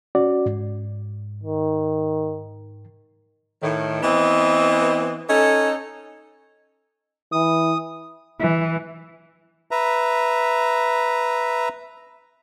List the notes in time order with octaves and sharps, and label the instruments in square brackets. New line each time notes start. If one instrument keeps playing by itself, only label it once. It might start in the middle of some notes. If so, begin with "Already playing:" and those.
[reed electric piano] C#4 F#4 D5
G#2
[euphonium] D#3
[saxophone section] A2 D#3
E3 B3 C4 D#5
C#4 D#4 A4
[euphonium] E3 [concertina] D#6
[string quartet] E3
[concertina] B4 E5 A#5